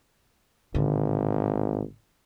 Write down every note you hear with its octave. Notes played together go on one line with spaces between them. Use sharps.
G#1 A2 D3